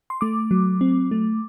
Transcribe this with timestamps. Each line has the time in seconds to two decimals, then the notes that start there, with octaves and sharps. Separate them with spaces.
0.10 C6
0.21 A3 D6
0.51 F#3
0.81 C4
1.11 A3